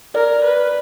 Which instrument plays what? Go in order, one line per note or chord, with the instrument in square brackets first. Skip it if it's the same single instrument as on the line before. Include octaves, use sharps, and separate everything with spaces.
[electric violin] A#4 [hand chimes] D5
[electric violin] B4